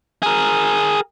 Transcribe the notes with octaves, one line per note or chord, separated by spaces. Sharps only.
G#4 A#4